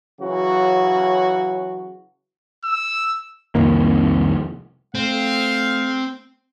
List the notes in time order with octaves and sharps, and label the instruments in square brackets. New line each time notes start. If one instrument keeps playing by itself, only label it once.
[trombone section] C#3 E3 F#3 F#4
[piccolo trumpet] E6
[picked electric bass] C2 F2 D#3 A#3
[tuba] A3 [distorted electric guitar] C4 [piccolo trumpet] F5